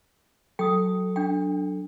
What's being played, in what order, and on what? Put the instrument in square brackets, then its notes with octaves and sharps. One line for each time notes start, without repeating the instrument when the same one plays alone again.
[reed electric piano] F#3 A4 [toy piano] G5 D#6
[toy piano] D4 G5